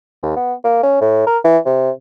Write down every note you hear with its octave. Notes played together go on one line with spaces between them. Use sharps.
D#2
B3
A#3
C#4
A2
A#4
E3
C3